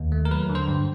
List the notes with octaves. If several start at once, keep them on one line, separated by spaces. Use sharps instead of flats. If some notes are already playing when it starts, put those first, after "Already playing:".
Already playing: D#2
A3
A#4
F#3 B4
D3
C5
G2